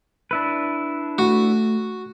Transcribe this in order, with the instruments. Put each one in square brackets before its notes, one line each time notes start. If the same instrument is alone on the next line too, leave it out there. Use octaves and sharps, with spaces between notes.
[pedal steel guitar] D4 E4 B4
[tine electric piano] A3 [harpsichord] F#4